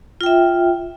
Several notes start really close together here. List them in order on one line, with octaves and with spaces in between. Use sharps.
F4 G5 E5